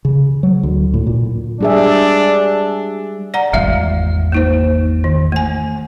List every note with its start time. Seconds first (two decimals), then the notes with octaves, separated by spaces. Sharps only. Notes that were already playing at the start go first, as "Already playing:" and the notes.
0.05 C#3
0.43 F#3
0.63 D2
0.94 A2
1.07 A#2
1.61 G3 D4 G#4 E5
3.34 D5 F#5 A#5
3.53 G#1 E2 G3 E5 F5
4.32 A#3 D#4 C5
5.04 D#3
5.32 A3 G#5